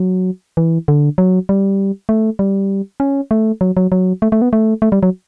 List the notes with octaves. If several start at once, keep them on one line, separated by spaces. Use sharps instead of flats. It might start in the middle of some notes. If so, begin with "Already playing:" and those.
Already playing: F#3
E3
D3
F#3
G3
A3
G3
C#4
A3
F#3
F#3
F#3
A3
A3
B3
A3
A3
G3
F#3